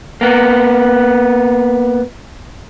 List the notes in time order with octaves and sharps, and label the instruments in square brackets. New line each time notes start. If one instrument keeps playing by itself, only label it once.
[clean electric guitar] A#3 B3